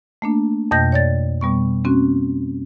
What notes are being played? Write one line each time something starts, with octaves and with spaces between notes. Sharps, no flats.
A3 A#3 D4
F2 B2 D#5 G5 G6 A#6
C#5 D5 A6
B2 G3 B3 C#6
A#3 C4 C#4 F#4